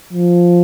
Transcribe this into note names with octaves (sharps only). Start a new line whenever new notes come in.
F3